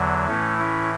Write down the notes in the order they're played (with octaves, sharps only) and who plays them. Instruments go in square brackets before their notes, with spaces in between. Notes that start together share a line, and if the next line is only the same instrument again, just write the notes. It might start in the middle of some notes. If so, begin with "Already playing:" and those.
Already playing: [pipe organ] E2 D3 F#3
A2 E3 A3 C#4
C#4 E4